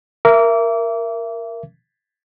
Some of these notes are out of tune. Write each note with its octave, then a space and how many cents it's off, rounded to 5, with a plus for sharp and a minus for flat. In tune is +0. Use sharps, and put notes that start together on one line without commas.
A#4 +0 E5 +30 D6 -30